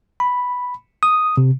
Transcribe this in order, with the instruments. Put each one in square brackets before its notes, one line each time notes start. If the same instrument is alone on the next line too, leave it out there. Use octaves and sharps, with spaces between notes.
[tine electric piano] B5
D#6
C3